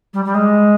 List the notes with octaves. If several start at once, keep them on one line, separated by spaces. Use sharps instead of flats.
G3
G3
G#3